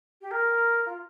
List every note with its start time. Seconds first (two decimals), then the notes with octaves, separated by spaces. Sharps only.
0.21 G4
0.31 A#4
0.86 F4